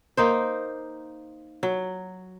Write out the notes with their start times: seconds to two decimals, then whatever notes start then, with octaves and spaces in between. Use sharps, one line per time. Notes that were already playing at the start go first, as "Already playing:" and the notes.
0.17 A#3 D#4 C5
1.63 F#3